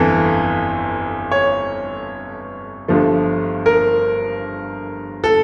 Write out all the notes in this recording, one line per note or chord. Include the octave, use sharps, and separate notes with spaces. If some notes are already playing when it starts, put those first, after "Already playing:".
Already playing: G1 F2 E3 A4
C#5
G1 G2 F3 A3
A#4
A4